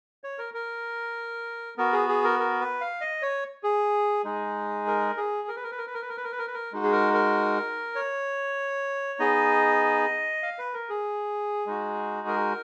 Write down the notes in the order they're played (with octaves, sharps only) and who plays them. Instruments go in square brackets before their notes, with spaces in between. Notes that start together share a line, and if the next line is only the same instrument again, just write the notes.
[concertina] C#5
A#4
A#4
B3 F#4 A#4
G#4
G#4
A#4
A#4
B4
F5
D#5
C#5
G#4
G#3 D#4 G#4
A#4
G#4
A#4
B4
A#4
B4
A#4
B4
A#4
B4
A#4
B4
A#4
B4
A#4
B4
A#4
G#3 D#4 F#4
G#4
A#4
A#4
C#5
B3 D#4 G#4 D#5
F5
B4
A#4
G#4
G#3 D#4 F#4
A#4